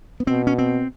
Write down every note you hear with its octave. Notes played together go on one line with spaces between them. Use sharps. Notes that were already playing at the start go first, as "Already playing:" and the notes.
B3
B2 C4
C#4
C4